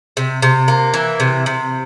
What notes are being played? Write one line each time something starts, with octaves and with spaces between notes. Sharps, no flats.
C3
C3
A#3
E3
C3
C3